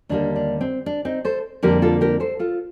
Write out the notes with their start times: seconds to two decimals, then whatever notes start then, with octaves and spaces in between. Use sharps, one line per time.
0.09 D#2 D3 G3 A#3 D4
0.36 D4
0.61 C4
0.86 D4
1.05 C4 D#4
1.25 A4 C5
1.63 F2 D3 G3 A#3 G4 A#4
1.82 F4 A4
2.01 G4 A#4
2.20 A4 C5
2.39 F4 A4